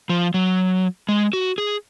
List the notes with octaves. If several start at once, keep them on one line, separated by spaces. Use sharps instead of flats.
F3
F#3
G#3
F#4
G#4